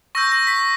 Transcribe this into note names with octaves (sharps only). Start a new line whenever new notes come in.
C#6 E6 G6 A#6
A#6
B6